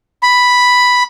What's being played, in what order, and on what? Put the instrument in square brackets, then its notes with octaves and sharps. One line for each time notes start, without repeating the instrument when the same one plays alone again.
[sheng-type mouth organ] B5